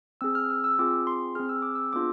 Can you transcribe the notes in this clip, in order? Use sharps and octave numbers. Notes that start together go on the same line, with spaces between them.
C4 G#4 E6
F6
E6
E6
C4 F4 G#4 D6
C6
C4 G#4 F6
E6
D6
E6
B3 D4 F4 G#4 D6